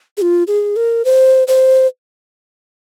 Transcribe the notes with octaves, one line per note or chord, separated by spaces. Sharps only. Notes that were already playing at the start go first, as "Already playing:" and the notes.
G#4
F4
G#4
A#4
C5
C5